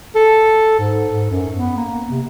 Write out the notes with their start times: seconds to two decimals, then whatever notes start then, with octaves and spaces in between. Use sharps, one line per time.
0.15 A4
0.79 G#2
1.12 G#2
1.31 F#2
1.58 B3
1.77 A#3
2.10 C3